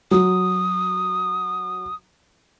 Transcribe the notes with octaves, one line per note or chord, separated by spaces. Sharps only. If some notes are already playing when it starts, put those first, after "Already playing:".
F#3 D#6